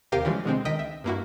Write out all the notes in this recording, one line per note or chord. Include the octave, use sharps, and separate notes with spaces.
D#2 C3 G4 A#4 F5 D#7
C#3 E3 F3 G3 G#3
B2 D3 G#3 C4
C#2 D#3 D#5 G5 B6
E5
G2 A#3 E4 F#4